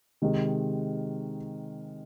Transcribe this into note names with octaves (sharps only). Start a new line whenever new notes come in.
C3 D#3 G#3